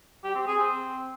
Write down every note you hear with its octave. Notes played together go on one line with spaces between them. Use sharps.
G4
C4
G#4
C4